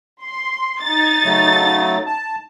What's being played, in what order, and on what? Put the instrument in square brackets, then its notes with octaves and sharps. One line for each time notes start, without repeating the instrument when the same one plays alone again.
[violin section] C6
D#4 A6
[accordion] C#3 F#3 A3
A5